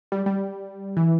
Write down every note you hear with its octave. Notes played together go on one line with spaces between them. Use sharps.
G3
G3
E3